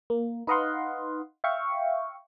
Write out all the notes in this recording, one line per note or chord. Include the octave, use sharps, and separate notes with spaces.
A#3
D#4 B4 D#5 F5 F#5 C6
E5 F5 G5 C#6